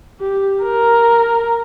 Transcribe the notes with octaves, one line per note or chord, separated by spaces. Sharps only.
G4
A#4